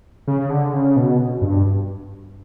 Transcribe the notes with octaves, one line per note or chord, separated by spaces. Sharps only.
C#3
D3
C#3
B2
G2